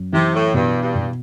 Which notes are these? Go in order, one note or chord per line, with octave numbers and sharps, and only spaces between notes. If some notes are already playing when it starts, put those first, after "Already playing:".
Already playing: F#2
C3 E3
A2
G2 B2
G2
B2